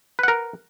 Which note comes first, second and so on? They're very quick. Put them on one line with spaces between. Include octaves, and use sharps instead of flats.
B4 F#5 A#4